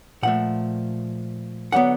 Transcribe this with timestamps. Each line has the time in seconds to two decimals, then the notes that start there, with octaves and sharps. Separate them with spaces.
0.23 A#2 F3 A3 F#5
1.72 D3 F#3 B3 F#5